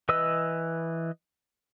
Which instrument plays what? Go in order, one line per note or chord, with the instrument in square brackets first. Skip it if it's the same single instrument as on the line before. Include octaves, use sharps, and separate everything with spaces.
[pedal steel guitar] E3 B4 D#5 E6